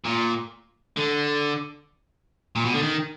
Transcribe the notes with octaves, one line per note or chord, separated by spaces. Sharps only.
A#2
D3
A#2
B2
D3
D#3